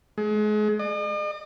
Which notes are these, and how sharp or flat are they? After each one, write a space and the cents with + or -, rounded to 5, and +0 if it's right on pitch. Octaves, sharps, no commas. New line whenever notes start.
G#3 +35
D#5 -45